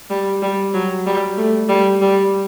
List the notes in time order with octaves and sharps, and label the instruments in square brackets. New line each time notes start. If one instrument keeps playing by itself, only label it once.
[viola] G3
G3
F#3
G3
A3
G3
G3